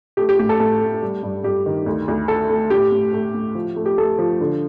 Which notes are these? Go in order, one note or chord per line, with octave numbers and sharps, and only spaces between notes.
A3 G4
G4
A2 G4
A4
A2 A4
A3
G3
G2
G2 G4
D#3
D2
D2
A3 A4
A3
A2 G4
A2
A3
A2
F3
A3
G4
A3 A4
F3
D3